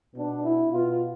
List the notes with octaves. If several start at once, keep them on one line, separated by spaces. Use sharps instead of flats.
B2 B3 D4
E4
B2 B3 F4